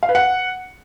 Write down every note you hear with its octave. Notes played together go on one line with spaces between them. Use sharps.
F5
B4
F#5